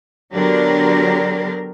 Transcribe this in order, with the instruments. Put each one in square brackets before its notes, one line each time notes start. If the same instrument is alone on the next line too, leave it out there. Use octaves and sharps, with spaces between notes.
[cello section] D3 F#3 B3 D4 G4 A#4